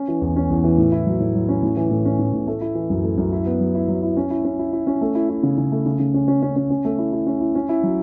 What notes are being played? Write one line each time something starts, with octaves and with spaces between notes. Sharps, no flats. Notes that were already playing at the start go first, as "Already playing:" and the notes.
Already playing: C#4
E3
E2
C#4
E2
E3
A2
E4
F#3
A2
F#3
C#4
A2
E3
A2
C#4
A2
A2
A3
E4
E3
F#2
A3
F#2
E4
B3
F#3
E4
F#3
E4
C#4
E4
C#4
E4
E4
C#4
A3
E4
E4
C#3
C#3
A3
C#3
C#3
C#4
C#4
C#4
C#4
C#4
A3
E4
E4
C#4
E4
C#4
E4
F#3